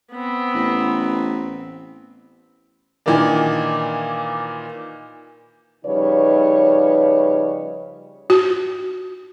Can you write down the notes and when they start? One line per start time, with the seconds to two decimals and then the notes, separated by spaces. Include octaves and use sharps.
0.12 B3 C4
0.54 A1
3.06 A#2 D#3 E3 A#3 D4
5.86 C#3 F3 G3 D#4 B4 C#5
8.30 F#4